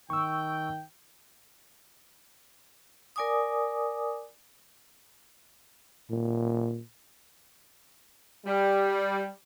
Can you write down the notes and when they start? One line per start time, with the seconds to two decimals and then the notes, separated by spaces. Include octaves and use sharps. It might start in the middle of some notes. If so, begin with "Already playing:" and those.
0.10 D#3 G5 C#6 E6
3.16 A#4 D5 G#5 D6 D#6
6.10 A#2
8.46 G3